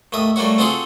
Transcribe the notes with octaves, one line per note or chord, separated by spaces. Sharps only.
D#2 A2 E5 D#6
G3 A3 A#3 F#4 C#5
C4 F4 F#4 G#4 A4 C5